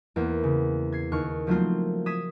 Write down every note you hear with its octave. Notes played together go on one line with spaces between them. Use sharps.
E2 A#3 B3
C#3
G#6 C7
D#2 C#6 F6
F3 F#3 A3 A#3 C4 F4
D#6 G#6 B6 D#7 E7